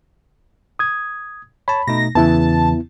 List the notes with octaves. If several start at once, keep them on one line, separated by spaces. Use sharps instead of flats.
D#6 G#6
C#5 A5 B5
B2 A3 D#4 A#6
E2 C#3 E3 B3 E4 A5